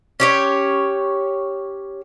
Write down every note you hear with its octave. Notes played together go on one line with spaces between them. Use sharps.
C#4 G4 C#5